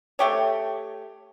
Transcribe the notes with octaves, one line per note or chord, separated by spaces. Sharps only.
A3 G4 C#5